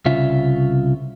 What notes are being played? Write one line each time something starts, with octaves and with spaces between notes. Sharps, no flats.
C2 C#3 F4 E5